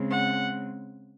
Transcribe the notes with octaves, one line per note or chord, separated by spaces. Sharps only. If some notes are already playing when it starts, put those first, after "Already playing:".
Already playing: C#3 G#3 C4
F#5